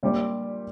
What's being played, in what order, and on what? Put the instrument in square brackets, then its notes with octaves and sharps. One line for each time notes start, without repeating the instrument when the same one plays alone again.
[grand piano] A#2 G3 D4 G4 D5